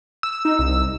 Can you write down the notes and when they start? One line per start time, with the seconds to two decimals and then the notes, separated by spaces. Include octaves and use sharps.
0.23 E6
0.45 D#4
0.59 C2